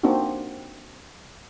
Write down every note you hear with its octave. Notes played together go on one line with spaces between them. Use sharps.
A#3 C4 D4 D#4 F#4